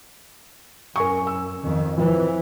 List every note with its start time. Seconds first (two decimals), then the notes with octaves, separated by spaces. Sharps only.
0.96 F#2 A#4 G#5 C#6
1.27 E6
1.60 F2 D#3
1.98 F2 E3